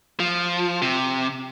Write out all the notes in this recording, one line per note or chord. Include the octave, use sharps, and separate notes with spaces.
F3
C3